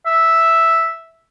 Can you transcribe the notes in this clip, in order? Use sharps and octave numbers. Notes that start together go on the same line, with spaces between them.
E5